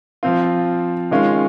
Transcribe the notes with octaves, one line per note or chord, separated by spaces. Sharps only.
F3 C4 F4
D#3 G#3 C#4 F4